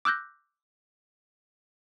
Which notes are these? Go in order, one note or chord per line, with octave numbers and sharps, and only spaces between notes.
D6 E6 F#6 G6 A#6